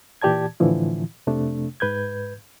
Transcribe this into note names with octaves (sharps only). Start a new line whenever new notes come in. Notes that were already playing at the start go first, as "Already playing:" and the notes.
A#2 E3 G4 D5 A5 G#6
A2 D3 E3 F3 E4
F2 C3 A3 D4
G#2 B4 G6 G#6